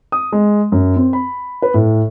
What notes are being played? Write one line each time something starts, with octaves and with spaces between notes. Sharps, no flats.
D#6
G#3
F#2
C4
B5
B4
A2